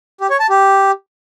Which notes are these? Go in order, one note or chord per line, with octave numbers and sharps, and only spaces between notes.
G4
C#5
A5
G4